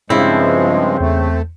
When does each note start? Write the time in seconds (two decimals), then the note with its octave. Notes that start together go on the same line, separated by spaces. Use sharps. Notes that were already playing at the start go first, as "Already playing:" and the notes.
0.10 G2 C#3 F3 G#3 C4 E4
1.00 E2 A3